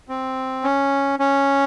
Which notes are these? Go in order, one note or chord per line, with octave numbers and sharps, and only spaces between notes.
C4
C#4
C#4